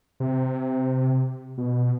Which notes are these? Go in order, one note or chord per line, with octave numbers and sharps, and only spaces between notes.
C3
B2